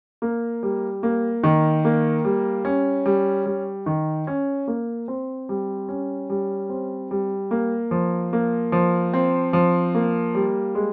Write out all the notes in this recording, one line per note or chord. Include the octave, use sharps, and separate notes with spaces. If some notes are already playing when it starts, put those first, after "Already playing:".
A#3
G3
A#3
D#3
A#3
G3
C#4
G3
G3
D#3
C#4
A#3
C4
G3
C#4
G3
C4
G3
A#3
F3
A#3
F3
C4
F3
A#3
G3
G#3